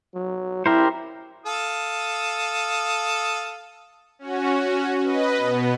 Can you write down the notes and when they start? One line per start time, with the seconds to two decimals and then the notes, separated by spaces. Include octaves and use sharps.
0.15 F#3
0.66 E4 G4 A#4 C5
1.46 A4 F5 D#6
4.19 C#4 F#4
5.03 B4 D#5
5.36 B2 B3